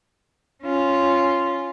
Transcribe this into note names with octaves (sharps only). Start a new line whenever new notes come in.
C#4 F4